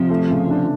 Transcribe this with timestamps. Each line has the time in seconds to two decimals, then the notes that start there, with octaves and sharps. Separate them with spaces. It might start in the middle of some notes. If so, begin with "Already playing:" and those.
Already playing: C3 F3
0.10 A3
0.30 C#3
0.50 D4